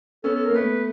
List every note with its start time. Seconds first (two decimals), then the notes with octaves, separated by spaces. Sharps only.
0.24 B3 C#4 A4
0.35 A4
0.45 A#4
0.50 A#3
0.54 A3 B3 B4